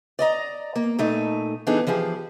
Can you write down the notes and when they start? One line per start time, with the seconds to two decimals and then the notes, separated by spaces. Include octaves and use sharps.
0.19 D5 D#5 A#5
0.76 A#3
0.99 A#2 A3 D#4
1.67 E3 B3 D4 D#4 G#4 A4
1.87 E3 F3 G4 G#4